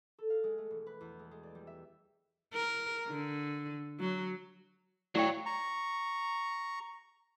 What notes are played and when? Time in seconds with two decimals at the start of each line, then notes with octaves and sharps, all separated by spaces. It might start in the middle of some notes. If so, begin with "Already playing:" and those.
0.18 A4
0.30 F5
0.44 G#3
0.58 A3
0.71 E1
0.86 B4
1.01 E2
1.19 G#3
1.31 G#3
1.43 D5
1.55 G3
1.67 E5
2.54 A#4
3.08 D3
4.00 F#3
5.15 A2 F#3 C#5 D5 F5 G5
5.46 A#5 C#6